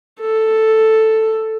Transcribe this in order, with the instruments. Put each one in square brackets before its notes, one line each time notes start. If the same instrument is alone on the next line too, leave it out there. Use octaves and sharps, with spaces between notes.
[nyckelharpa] A4